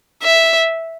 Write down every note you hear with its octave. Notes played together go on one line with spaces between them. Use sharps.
E5